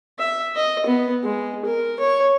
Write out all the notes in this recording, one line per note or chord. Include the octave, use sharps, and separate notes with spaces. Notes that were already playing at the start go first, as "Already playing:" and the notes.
E5
D#5
B3
G#3
A#4
C#5